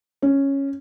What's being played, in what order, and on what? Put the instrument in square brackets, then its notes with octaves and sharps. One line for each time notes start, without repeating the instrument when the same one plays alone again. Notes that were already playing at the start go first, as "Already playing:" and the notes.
[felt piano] C#4